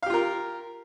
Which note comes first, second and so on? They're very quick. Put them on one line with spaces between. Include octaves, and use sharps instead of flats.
F5 G4 F4 A#4